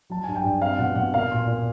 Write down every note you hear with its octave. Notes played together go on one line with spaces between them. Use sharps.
F#3 A5
G2 G#5
G5
G2
C4 F5
B2 F#5
B2 F#5
A#3 F5
A#2
A#2